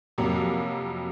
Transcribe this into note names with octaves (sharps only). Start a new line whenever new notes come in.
F2 C3 F#3 A#3